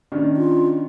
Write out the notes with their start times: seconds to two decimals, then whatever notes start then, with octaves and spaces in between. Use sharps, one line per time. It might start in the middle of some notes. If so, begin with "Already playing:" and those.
0.12 D#3 C#4 D4
0.37 F4